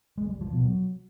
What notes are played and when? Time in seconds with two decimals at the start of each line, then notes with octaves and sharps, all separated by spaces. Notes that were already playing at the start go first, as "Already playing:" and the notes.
0.18 G#3
0.29 G3
0.41 F3
0.53 B2
0.65 F#3